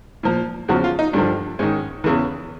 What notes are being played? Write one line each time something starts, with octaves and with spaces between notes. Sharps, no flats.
A#2 F3
E2 C#3 F3 F#4
F4
D#4
G2 D3 F3 D4
G#2 D#3 C#4
E2 C#3 E3